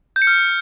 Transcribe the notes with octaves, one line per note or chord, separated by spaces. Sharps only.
G6
C#7
F6